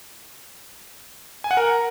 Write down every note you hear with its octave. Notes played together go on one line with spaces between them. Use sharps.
G#5
F#5
A#4